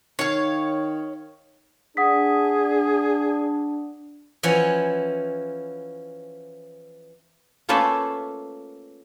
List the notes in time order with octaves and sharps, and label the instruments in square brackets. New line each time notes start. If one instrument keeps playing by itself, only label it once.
[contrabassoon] D#3 [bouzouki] C#5 F5
[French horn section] D4 [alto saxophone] G#4 [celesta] F#5 D#6 B6
[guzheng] E3 F3 C#4 F#5 G#5
[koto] A3 A#3 C#4 F4 A4 B4